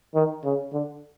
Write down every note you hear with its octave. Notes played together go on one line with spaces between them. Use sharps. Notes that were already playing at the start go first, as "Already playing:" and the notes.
D#3
C#3
D3